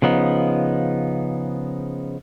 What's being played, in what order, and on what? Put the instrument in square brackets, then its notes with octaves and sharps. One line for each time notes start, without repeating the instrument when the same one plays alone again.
[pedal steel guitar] C#3 F3 B3 D#4